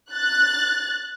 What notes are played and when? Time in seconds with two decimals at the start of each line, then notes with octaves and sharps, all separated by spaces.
0.12 F#6 A6